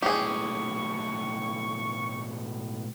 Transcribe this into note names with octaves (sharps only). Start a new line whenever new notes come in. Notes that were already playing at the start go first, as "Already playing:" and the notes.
B1 A2 G4 G#4 C#6